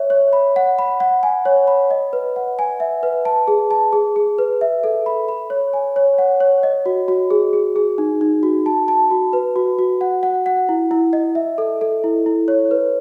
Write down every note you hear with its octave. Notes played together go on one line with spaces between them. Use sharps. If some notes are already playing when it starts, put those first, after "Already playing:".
Already playing: C#5 E5
C#5
B5
F#5
B5
F#5
G#5
C#5
B5
D#5
B4
F#5
G#5
E5
B4
A5
G#4
A5
G#4
G#4
B4
E5
A4
B5
B5
C#5
G#5
C#5
F#5
C#5
D#5
F#4
F#4
G#4
G#4
G#4
D#4
D#4
F#4
A5
A5
F#4
B4
F#4
F#4
F#5
F#5
F#5
E4
E4
D#5
E5
A4
A4
E4
E4
C#5
B4